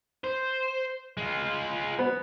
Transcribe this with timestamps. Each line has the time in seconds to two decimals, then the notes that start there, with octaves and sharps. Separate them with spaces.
0.24 C5
1.17 G#3 F4
1.99 B3